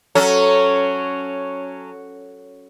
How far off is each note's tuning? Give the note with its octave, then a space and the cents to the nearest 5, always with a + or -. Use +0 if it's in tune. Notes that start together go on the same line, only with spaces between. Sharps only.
F#3 +0 C#4 +0 A4 +0